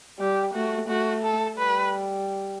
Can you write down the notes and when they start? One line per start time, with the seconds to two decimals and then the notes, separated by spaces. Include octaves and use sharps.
0.19 G3 G4
0.54 A3 F#4
0.88 A3 F#4
1.23 A4
1.58 G3 B4